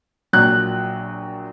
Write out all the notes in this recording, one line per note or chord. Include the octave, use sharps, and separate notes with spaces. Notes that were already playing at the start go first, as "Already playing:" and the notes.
A#1 A#2 F#3 F#6